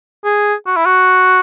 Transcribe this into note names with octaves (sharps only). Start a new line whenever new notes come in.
G#4
F#4
E4
F#4